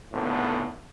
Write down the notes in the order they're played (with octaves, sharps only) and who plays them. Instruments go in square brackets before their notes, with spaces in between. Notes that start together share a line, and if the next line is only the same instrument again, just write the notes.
[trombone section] G#1 C#2 A2 D3 B3